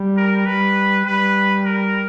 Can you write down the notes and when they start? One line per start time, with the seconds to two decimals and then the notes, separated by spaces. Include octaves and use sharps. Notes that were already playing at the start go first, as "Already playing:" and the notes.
Already playing: G3
0.17 A#4
0.46 G3 B4
1.05 G3 B4
1.64 A#4